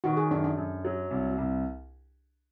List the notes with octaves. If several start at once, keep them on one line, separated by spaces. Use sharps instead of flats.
D#3 F#4
G#4
F#2 D4
D4
F#2
F#3
C2
C2